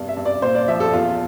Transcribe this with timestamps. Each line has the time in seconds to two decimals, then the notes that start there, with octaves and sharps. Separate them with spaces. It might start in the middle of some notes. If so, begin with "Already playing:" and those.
Already playing: E2 G2 C3
0.08 E5
0.17 G2
0.25 D5
0.42 A#2 C5
0.55 D5
0.68 F3 E5
0.80 A4
0.93 E2 F4